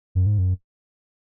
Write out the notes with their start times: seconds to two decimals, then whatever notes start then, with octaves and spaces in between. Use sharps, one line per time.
0.15 F#2
0.26 G#2
0.38 F#2